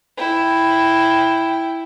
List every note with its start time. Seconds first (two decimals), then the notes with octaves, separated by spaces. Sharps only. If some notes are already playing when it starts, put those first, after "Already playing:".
0.17 E4 G5